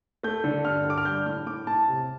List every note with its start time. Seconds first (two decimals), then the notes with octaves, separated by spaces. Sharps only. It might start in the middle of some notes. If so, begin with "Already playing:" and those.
0.23 A3 G6
0.44 D3
0.64 G2 F6
0.85 D3
0.90 D6
0.98 F6
1.05 G3 G6
1.26 A2 F6
1.47 A2 D6
1.67 A2 A5
1.88 C3